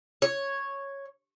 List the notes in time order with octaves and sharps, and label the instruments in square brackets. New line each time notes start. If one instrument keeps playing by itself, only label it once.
[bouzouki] C#5